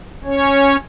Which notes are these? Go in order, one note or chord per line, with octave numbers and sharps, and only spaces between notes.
C#4 C#5